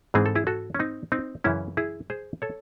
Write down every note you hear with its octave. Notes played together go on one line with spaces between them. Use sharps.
G#2 E3 G#3 C4 G#4
A4
E4 G#4
F#4 A4
C#4
C4 D#4
C4 D#4
F#2 C#3 E3 C#4 E4
E4 G#4
G#4 C5
A4 C#5